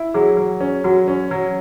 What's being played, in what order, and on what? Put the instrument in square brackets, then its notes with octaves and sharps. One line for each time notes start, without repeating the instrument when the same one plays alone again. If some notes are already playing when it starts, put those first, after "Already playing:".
Already playing: [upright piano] E4
[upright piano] F#3 [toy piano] G#4
[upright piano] F#3
C#4
[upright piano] F#3 [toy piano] F#4
[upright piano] C#4
F#3